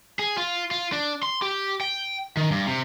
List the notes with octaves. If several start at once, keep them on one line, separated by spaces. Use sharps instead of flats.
G#4
F4
F4
D4
C6
G4
G5
D#3
G2
C3